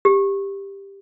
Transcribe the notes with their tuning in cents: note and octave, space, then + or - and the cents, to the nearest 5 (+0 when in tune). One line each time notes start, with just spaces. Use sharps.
G4 +10